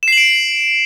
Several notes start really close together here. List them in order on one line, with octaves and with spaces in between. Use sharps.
E7 C7 F#7 D7